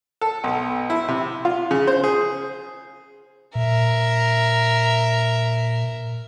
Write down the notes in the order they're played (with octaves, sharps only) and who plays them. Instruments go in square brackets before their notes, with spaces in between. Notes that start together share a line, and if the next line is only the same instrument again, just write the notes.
[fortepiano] A4
B1
E4
C3
F4
C#3
C5
G#4
[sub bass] A#2 [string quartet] A#4 E5